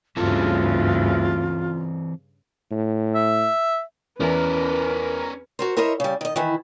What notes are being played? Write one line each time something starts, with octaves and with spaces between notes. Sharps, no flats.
D2 G2 C#3 E3 C4 F4 A4
A2
E5
E2 E3 C#4 A#4 B4 D5
F#4 A#4 C5
E4 A#4 C5 C#5 D#5 E5
C#3 G3
D#3 D#5
D#3 E3 E4